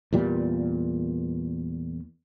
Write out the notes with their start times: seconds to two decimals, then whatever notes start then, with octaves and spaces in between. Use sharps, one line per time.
0.13 E2 A#2 G3